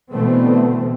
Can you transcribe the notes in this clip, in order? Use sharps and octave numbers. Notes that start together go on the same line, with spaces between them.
B2 D3 E3 A3 B3 C4